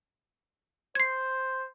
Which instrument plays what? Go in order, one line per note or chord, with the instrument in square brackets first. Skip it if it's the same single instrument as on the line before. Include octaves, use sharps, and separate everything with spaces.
[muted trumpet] C5 [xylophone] G#6 C7